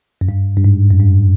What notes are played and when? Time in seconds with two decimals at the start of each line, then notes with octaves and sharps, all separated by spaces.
0.21 F#2
0.29 G2
0.57 G2
0.64 G#2
0.91 F#2
1.00 G2